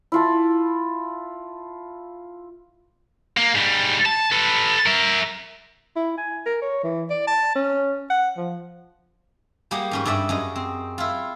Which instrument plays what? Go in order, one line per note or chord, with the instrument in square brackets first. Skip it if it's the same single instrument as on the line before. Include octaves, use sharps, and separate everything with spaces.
[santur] E4 F4 A5
[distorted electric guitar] A#3
G#2 G3
A5
A4 B4
A#4 E5
[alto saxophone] E4
G#5
A#4
C#5
E3
D5
A5
C#4
F#5
F3
[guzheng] G3 A#3 G4 G#4 F#5
G#2 C#4 B4
G2 G#4 D5 E5
F#2 G#4 D#5
C4
E4 F4